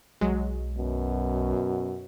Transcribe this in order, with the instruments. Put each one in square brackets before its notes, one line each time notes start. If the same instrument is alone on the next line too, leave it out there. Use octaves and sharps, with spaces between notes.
[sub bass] B1 [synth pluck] F#3 G#3
[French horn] F#2 [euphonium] B2